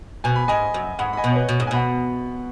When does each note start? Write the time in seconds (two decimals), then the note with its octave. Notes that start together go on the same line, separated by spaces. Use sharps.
0.24 B2 G#5
0.36 B5
0.48 G#2 D#5 G#5
0.74 F#2
0.99 G#2 F#5 B5
1.13 B5
1.17 D#5 G#5
1.24 B2
1.30 C#5
1.36 B4 D#5
1.49 B2
1.60 G#2
1.67 G#5
1.71 B2 F#5 B5